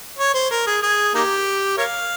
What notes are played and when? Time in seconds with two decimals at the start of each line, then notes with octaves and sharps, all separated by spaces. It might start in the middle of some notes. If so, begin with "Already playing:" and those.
0.19 C#5
0.34 C5
0.50 A#4
0.67 G#4
0.82 G#4
1.14 A#3 D#4 G4
1.78 A#4 C#5 F5